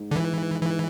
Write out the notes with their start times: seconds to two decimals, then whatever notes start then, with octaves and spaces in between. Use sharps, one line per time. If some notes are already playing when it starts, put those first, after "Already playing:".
Already playing: G#2
0.11 D3
0.16 E3
0.61 E3